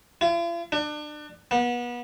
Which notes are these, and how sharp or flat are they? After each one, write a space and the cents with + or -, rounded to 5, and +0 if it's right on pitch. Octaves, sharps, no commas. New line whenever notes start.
F4 -45
D4 +30
B3 -30